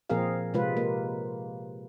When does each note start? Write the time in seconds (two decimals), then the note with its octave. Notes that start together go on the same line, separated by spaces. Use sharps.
0.10 A#2 F3 C4 G#4 A#4 F5
0.54 C3 G#3 F4 B4
0.77 A#3